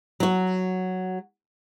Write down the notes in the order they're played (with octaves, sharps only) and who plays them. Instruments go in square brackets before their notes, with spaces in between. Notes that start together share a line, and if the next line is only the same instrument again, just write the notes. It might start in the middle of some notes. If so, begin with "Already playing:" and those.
[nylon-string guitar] F#3 F#4